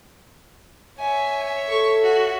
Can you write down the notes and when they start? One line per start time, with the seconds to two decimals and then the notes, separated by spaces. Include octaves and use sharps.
0.99 C#5 E5 G#5
1.69 A4 C#6
2.02 F#4